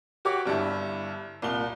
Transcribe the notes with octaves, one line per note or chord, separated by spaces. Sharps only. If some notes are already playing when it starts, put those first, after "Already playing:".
F#4 G4 C#5 D6
G1 G2 D4 E4
C2 A#2 G7